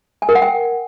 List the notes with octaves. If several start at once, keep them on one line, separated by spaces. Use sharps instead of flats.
G#5
A#4
F#5
G5